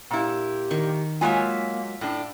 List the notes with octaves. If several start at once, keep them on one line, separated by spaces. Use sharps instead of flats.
A#2 E4 G4
D#3 C#6
F#3 G#3 A#3 F4 C#5 E5 G#5
A2 D4